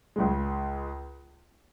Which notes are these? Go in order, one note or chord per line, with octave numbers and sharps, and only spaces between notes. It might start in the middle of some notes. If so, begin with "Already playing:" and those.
C#2 C#3 G#3